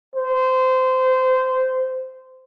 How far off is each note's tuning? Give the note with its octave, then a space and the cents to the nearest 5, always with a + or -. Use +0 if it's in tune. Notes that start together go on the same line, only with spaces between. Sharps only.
C5 -20